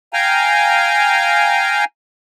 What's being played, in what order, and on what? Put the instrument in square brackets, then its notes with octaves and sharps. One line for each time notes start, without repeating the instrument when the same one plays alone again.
[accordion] F5 G5 G#5 A#5